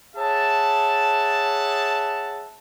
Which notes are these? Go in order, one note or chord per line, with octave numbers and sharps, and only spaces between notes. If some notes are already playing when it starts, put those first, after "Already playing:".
G#4 C#5 E5 F#5 A5